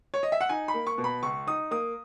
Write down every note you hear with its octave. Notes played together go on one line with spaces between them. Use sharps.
C#5
D#5
E5
F#5
D#4 G#5
B5
A#3
C#6
B2
B5
C#2 C#6
D#4 D#6
A#3 D#6